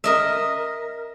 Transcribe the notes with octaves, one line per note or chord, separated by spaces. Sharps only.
A#4 D#5 E5